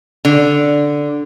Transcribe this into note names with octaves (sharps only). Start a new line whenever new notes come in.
D3